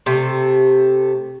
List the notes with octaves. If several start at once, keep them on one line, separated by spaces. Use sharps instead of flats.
C3 A3